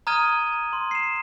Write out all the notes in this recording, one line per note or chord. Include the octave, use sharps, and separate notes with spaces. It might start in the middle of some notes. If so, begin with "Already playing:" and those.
A#5 D#6 F6 G#6 D#7 G7
C6
C7 E7